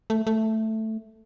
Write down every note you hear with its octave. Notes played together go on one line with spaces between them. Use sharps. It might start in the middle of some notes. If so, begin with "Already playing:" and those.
A3
A3